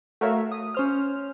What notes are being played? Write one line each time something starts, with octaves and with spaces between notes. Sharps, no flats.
A3 F#4 A#4 C#5 E5 F5
D#6
C#4 C5 F6